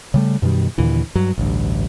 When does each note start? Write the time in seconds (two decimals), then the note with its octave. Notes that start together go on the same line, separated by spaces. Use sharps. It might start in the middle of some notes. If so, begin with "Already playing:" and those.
0.14 C#3 G3 A3
0.42 F#2 B2 D#3 G3
0.78 D#2 A#2 D3 E3
1.15 G2 F#3
1.38 A1 D2 G2